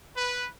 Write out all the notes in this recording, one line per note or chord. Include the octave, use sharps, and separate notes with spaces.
B4